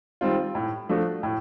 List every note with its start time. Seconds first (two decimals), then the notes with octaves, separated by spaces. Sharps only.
0.21 D#3 G3 C4 F4
0.55 A2
0.89 F3 A3 D4 F#4
1.23 A2